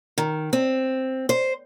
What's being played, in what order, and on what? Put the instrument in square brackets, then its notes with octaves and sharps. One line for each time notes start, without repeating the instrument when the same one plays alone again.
[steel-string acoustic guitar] D#3
C4
C5